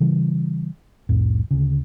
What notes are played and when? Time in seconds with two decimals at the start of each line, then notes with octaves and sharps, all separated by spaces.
0.01 C#3 E3 G3
1.09 C2 F2 A2
1.51 D2 C#3